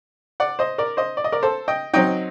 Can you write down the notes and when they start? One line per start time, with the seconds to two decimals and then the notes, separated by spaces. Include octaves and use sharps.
0.40 D5 F#5
0.59 C5 D#5
0.78 A#4 D5
0.97 C5 D#5
1.17 D5
1.24 D#5
1.32 A#4 D5
1.43 A4 C5
1.68 D#5 G5
1.93 F#3 C4 D#4 D#5 G5